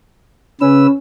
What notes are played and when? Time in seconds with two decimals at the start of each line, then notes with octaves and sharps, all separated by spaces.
0.61 C#3 C#4 B4 E6